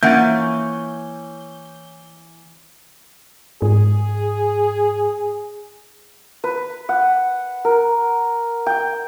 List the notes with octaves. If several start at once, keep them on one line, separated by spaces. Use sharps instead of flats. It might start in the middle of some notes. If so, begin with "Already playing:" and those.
E3 A#3 C#4 E5 F#5 G6 A6
G#2 G#4
B4
F#5
A#4
G5